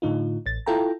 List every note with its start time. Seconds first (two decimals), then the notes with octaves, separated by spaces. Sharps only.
0.02 A2 D3 D#4 F4
0.46 A1 A6
0.66 E4 F4 A4 G5 A#5